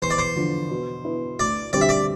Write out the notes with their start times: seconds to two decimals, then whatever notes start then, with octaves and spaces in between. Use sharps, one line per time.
0.02 E2 C5
0.10 D5
0.18 C5
0.36 D3 F3
0.71 B2
1.04 B3 E4
1.39 D2 D5
1.73 D3 G3 C4 G4 D5
1.81 E5
1.89 D5